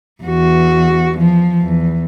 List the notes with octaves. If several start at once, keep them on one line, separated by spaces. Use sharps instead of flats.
E2 F#4
F3
E2